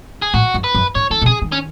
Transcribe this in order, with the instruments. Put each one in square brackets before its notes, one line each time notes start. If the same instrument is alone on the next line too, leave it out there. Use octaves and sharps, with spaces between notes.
[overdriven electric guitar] G#4
[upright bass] A2 [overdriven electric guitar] F#4
[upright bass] F#2
[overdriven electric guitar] B4
[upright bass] F#2
[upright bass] G#2 [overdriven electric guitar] C#5
[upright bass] D#3 [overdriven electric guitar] A4
[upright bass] B2
[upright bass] C#3 [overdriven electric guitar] G#4
[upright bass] D#3
[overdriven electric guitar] C#4